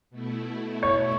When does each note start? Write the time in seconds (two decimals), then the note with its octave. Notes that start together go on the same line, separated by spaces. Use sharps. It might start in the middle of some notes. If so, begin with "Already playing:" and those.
0.10 B2 A3 E4
0.83 C#5